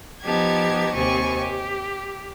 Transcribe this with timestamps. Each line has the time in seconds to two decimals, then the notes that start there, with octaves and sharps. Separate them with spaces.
0.23 F3 B3 D#4 G4 A5 G#6
0.94 D#2 C3 C4 G4 G#5 C#6
1.38 G4